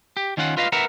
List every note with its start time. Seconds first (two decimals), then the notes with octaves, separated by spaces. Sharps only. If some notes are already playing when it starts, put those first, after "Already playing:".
0.17 G4
0.37 D#3 C#4 F4 F#5
0.57 F4 B4 D#5 F5
0.72 A#4 B4 E5 F#5 A#5